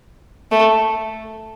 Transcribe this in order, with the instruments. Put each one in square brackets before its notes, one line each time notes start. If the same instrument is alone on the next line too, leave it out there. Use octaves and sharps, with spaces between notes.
[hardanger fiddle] A3